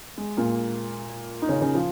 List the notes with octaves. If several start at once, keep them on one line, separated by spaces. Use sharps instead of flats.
G#3
A#2 A#3
D#4
C#3 C#4
C#3 C#4
F3 F4